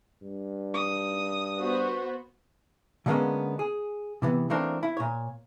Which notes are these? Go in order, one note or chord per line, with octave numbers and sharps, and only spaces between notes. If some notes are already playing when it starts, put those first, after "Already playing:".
G2
D#6
B3 F#4 C5
D3 G3 G#3 A#3 B3 C#4
G#4
C3 E3 B3
E3 A3 A#3 C4 D4 A#4
E4
A#2 C#5